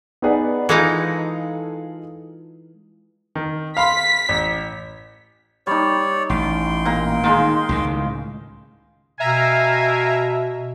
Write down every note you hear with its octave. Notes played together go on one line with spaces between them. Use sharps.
B3 D#4 G#4 B4 D5 F#5
E3 G#3 D#4 F4 G#4 A4 C#7
D#3
F5 B5 C6 B6
A1
G3 D#4 C#5 D5
A1 G5 C6
A#2 A#5
D#3 G#3 D#4 F4
C#2 A2 D#3
B2 A#4 E5 F5 G#5 A#5